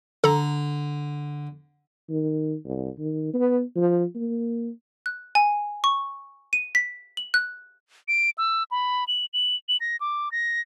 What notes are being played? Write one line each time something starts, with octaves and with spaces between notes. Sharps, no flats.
D3 A4 A#5
D#3
C2
D#3
B3
F3
A#3
F#6
G#5
C#6
D#7
B6
F#7
F#6
D7
E6
B5
F#7
F#7
F#7
A#6
D6
A#6